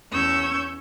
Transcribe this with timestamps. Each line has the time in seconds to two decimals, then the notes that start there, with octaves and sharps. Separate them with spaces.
0.12 E2 C#4 C#6 E6 G6 G#6